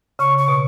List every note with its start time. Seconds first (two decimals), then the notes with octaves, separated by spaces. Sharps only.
0.19 C#3 C#6
0.38 C#6
0.48 B2